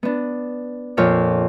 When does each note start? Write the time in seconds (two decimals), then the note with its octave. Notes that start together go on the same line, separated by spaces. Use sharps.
0.03 B3 D4
0.97 F2 A#2 C#5 F5 D6